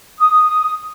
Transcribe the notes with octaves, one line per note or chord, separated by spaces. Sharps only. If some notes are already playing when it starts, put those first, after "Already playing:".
D#6